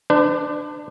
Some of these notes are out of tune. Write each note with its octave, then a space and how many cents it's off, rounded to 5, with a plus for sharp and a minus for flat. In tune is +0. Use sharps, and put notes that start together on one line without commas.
D4 +20 C5 -45